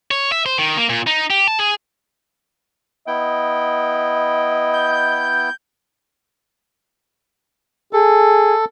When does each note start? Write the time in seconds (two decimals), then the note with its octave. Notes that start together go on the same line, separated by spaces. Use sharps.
0.11 C#5
0.32 E5
0.46 C5
0.58 D#3
0.77 A#3
0.89 A#2
1.07 D#4
1.30 G4
1.48 A5
1.59 G#4
3.07 B3 E4 D#5 G5
4.73 G6
7.93 G#4 A4